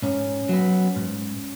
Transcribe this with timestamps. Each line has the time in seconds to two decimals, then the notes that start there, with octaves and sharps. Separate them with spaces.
0.02 G#2 C#4
0.49 F#3 B3
0.96 G#2